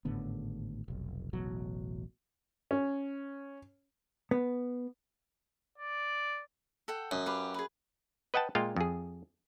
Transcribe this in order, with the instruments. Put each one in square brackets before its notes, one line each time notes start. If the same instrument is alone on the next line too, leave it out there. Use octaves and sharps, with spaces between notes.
[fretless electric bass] G#1 A2 D3 B3
F1 B1
E1 A1 B2 F#3
[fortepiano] C#4
[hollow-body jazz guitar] B3
[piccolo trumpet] D5
[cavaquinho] A4 F#5 G5
[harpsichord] F#2 [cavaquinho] D#5
[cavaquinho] G4 B4 F5
G#4 B4
[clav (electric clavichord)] B4 D#5 F#5 G5 A5
A#2 G#3 F4 F5 G5
F2 G#4